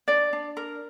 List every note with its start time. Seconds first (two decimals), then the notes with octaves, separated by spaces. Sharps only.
0.08 D4 D5
0.33 D4
0.57 A#4